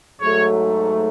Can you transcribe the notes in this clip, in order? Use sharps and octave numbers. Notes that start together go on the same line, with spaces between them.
G#2 F#3 A3 C#5